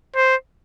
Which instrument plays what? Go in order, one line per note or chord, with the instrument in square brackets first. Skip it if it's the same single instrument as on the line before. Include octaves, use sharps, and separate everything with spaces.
[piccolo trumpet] C5